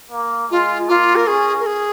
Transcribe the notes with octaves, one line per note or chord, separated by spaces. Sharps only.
A#3
G#3 F4
A#3 F4
A#4
C#4 G#4
A#4
G#4